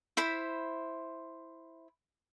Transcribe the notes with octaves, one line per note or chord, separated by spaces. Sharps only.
E4 C5 B5